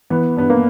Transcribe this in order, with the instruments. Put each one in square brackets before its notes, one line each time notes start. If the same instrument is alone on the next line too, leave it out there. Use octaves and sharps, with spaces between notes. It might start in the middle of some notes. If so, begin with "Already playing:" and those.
[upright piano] E3 B3
G2 B3
A#3